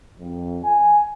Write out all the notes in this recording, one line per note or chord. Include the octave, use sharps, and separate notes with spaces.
F2
G#5